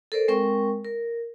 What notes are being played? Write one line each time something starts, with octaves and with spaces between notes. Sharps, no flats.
A4 A#4 C5 D5
G#3 C4 A#4 G5 C#6
A#4